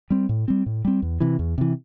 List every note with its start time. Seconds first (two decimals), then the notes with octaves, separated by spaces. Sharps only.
0.10 G3 C4
0.29 A2
0.48 G3 C4
0.66 A2
0.85 G3 C4
1.02 E2
1.20 C3 E3
1.39 E2
1.58 C3 E3